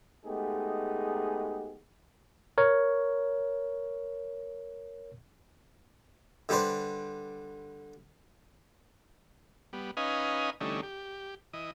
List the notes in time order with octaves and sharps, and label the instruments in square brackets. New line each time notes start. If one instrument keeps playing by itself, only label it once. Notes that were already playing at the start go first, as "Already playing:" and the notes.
[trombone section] G#3 A3 B3 D#4 G4 G#4
[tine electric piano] A#4 C#5
[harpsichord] D3 G3 G4 B4 C5
[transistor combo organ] G3 B3
C#4 D#4 B4 D#5 F5 G#5
D3 E3 G3 A3 C#4 D#4
G4
E3 D#5